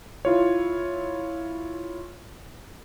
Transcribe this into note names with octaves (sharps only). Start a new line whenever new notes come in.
E4 F4 C#5